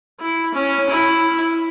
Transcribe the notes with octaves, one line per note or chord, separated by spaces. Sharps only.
E4
C#4
E4